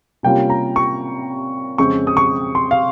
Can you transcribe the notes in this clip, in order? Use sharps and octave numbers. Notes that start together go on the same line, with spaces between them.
C3 G3 A#3 C#4 F4 G5
A#5
C#6
F2 C#3 G#3 C4 C#6
D#6
C#6
C6
F5